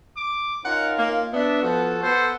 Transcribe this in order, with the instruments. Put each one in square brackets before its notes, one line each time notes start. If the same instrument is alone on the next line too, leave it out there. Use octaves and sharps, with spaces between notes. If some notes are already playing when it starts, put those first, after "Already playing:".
[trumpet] D6
[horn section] C#4 D#4 F4 [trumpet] A#4 [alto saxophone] F#5
[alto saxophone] A#3
[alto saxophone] B3 [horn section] D4 [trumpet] E5
[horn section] F3 F#4 [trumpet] A4
[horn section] B3 A4 [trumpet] C5